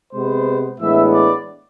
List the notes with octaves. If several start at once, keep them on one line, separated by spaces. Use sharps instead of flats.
C3 G#3 B3 C5
A2 E3 G#3 B3 D4 E5
D5